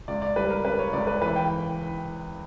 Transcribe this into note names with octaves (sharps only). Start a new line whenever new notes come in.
C#2 D5
D5
G3 B4
A#4
C#3 B4
C#5
C#2 D5
B4
E3 B4
G5